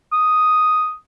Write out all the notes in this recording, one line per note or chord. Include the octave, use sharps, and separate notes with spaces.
D#6